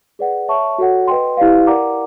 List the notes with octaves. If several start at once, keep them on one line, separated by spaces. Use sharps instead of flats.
G#4 B4 D5 F#5
C#5 E5 A5 C#6
F#4 A4 C#5 F#5
B4 D#5 G5 C6
E4 G4 B4 D5 F5
A#4 D5 F#5 A#5 D6